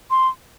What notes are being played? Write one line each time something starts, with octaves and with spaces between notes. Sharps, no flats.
C6